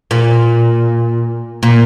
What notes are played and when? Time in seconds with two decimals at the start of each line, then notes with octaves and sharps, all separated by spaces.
0.11 A#2
1.63 A#2